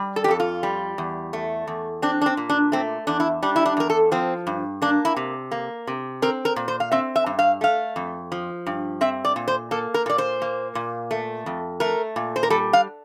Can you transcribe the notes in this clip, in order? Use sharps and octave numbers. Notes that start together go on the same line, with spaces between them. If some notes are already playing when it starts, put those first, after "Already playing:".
Already playing: G3
A4
G4
F2 A4
F4
G3
E2
A3
E2
C4 D4
D4
C4
A#2
D4
A3 C4
E2 D4
E4
G3 D4
E4
D4
E2 A#4
A4
F3 C4
G2
A#3 D4
E4
C3
A#3
C3
C4 A#4
A#4
A#2
C5
F5
C4 E5
E5
G2
F5
A3 F5
F2
F3
G2
C4 E5
D5
A#2
C5
A#3 A4
A#4
A#2 D5
C5
A#3
A#2
A3
F2
A3 A#4
A#2
C5
A#4
G3 A4
F5